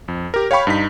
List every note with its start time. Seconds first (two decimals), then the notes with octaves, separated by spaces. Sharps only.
0.08 F2
0.34 G4 A#4
0.51 C#5 F5 G5 B5 C#6
0.67 G2 D#4 B6